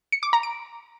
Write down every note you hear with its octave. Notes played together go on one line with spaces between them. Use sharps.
C#7
D6
A#5
D7